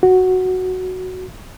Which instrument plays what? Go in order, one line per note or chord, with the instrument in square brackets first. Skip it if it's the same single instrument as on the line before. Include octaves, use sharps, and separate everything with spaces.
[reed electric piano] F#4